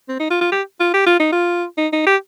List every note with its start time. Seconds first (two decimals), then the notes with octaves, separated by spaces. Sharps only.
0.09 C4
0.19 D#4
0.30 F4
0.41 F4
0.52 G4
0.80 F4
0.94 G4
1.06 F4
1.20 D#4
1.32 F4
1.78 D#4
1.93 D#4
2.07 G4